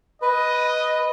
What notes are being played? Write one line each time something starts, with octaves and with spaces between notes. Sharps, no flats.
B4 D#5